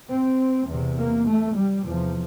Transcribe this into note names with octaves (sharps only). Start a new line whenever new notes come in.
C4
E2 C3
A#3
A3
G3
E2 C3 F3